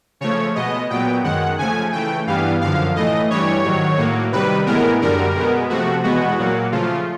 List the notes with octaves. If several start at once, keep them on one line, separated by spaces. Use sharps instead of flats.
C#3 F3 A3 C#5
B2 G#3 B3 D#5
A#2 F#3 B3 G5
F#2 D#3 G#3 F#5
C#3 F3 A3 G#5
C#3 E3 A3 G5
G2 E3 G3 B3 F5
F#2 D3 F3 F5
A2 E3 A3 D#5
G2 E3 G3 C#5
G#2 D#3 F#3
A2 F#3 A#3
C3 D#3 G3 B4
A2 E3 G#3 B3 A#4
F#2 D3 G3 A#4
B2 G#3 B3
C3 F3 A3 F#4
E2 B2 G#3 B3 F#4
A#2 F#3 A#3
C#3 F3 A3 F4